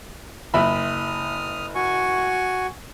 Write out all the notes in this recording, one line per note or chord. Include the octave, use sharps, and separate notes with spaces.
F#1 E5 B5 D#6 F6
F#4 G#5 C#6